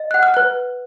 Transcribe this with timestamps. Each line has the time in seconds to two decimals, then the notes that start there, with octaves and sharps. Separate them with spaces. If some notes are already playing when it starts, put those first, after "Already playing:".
Already playing: D#5
0.11 F#5 F#6
0.23 F6
0.34 B4 F#6